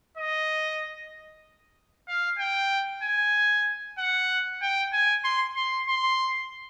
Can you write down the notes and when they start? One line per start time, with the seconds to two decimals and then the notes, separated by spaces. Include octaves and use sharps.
0.18 D#5
2.08 F5
2.39 G5
3.03 G#5
3.98 F#5
4.62 G5
4.93 G#5
5.25 C6
5.56 C6
5.88 C6